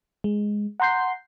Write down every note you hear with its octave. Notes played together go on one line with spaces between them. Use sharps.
G#3
F#5 A#5 C6 G6 C7